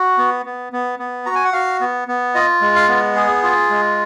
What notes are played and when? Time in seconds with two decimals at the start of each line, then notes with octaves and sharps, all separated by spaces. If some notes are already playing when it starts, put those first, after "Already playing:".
Already playing: F#4
0.18 B3
0.46 B3
0.73 B3
0.99 B3
1.26 F#4 A#5
1.35 G#5
1.44 F#5
1.53 F#4 F5
1.81 B3
2.08 B3
2.34 F4 D#5
2.62 G#3
2.76 F5
2.88 B3
3.15 G#4
3.43 F4
3.70 G#3